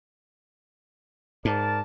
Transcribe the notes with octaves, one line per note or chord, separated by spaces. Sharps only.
G#2 A#4 D5 A5